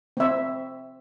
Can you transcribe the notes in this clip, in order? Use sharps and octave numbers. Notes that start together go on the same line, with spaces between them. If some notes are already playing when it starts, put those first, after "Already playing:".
C4 E5